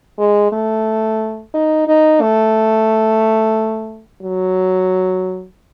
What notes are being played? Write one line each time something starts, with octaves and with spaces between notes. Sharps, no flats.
G#3
A3
D#4
D#4
A3
F#3